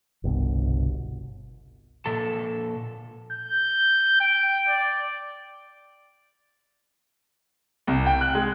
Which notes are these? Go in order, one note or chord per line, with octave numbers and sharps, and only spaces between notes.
G1 C2 B2
A#2 F3 A4 A5
G6
G5
D5
C2
G5
F#6
G#3